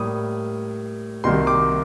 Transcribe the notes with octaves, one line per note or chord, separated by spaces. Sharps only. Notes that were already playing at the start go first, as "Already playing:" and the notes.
Already playing: A2 G3 A#3 D#6
C2 C3 D#3 A#3 C6
D6